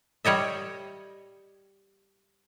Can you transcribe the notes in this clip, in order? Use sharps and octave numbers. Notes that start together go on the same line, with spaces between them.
G3 C#5 D#5 E5